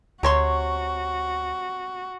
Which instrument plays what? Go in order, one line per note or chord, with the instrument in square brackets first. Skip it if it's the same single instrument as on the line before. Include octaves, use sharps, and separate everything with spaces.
[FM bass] D2 [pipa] C3 C#5 C6 [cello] F#4